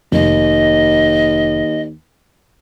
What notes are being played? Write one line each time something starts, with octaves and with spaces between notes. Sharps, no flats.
F1 D#2 D#5